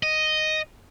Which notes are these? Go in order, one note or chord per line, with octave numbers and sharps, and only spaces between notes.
D#5